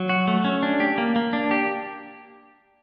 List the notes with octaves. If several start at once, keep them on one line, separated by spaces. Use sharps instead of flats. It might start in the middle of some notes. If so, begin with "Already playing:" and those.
Already playing: F#3
F#4
A3
C#4
D4
G4
A#3
A#3
D4
G4